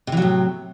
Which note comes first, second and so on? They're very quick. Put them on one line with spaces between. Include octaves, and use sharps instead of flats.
C3 E3 F#3 A2